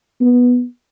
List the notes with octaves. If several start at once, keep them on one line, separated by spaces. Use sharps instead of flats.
B3